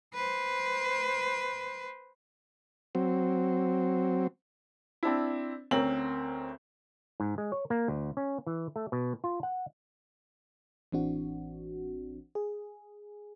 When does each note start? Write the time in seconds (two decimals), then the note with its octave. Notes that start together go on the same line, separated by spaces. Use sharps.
0.14 B4 C5
2.95 F#3 C4
5.03 C4 D4 E4
5.71 D2 C4 C#4 A#4 F#7
7.20 G#2
7.38 G#3
7.52 C#5
7.70 A#3
7.88 D2
8.17 C#4
8.47 E3
8.76 A3
8.92 B2
9.24 F4
9.43 F#5
10.92 A1 E3 C4 D4 F#4
12.35 G#4